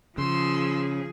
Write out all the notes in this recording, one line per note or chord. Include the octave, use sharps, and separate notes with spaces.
C#3 F3 G#4 C6 E6